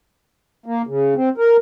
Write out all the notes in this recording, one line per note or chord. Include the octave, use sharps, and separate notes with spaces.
A#3
C#3
C4
A#4